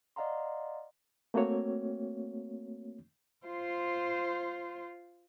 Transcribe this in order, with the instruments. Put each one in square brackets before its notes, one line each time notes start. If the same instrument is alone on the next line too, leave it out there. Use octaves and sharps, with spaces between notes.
[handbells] D5 D#5 F5 F#5 A#5 C6
[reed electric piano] A3 A#3 C4 F#4 C#5
[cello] F4 C5